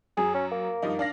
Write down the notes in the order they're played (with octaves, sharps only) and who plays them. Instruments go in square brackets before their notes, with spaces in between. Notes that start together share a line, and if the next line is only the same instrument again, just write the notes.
[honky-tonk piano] F#2 [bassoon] G#4
[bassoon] C#4
A#3
[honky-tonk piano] G2 F3 D#4
D4 F5 A#6